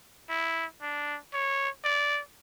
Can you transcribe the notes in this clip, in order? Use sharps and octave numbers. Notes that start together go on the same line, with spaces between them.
E4
D4
C#5
D5